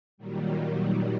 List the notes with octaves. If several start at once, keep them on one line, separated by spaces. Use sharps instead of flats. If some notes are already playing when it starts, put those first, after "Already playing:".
A#2 D#3 F#3 G3